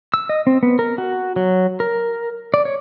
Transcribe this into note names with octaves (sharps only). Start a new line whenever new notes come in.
E6
D#5
C4
B3
A#4
F#4
F#3
A#4
D5
C#5